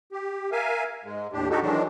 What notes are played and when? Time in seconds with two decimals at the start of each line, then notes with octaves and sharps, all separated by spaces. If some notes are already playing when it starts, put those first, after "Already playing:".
0.12 G4
0.52 A#4 E5 F5 G#5
1.04 G#2 G#3
1.33 D#2 A2 D4 G4
1.50 D#4 F#4 G4 A4
1.62 D#3 E3 F#3 G#3 D4